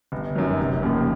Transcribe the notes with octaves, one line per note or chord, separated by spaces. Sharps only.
G1
F#2 D#3 F#3
F1
D#2 C#3 F3 A#3